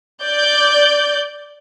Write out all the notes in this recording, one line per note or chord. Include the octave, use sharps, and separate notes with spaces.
D5 G6